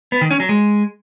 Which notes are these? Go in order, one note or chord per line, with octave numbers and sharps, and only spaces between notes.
B3
D#3
C#4
F#3
G#3